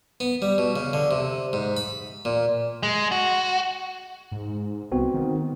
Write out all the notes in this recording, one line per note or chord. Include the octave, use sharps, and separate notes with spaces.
B3
G3
B2
C#3
D3
C3
G#2
B5
A#2
G#3
F#4
G#2
C2 B3 C4 F#4
D#3